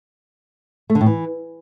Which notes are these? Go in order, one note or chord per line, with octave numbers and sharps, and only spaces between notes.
A3
D3
A2
E3